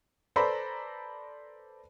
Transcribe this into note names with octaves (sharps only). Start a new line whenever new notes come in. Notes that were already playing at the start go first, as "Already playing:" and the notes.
A4 B4 C5 D5 A#5 B5